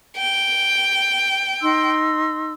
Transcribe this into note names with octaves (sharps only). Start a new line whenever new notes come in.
G5
D#4 C6 E6